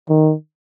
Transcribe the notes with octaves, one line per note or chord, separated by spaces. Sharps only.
D#3